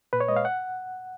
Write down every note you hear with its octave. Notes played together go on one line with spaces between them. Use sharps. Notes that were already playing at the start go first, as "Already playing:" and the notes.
A#2 B4
C#5
G#3 D#5
F5
F#5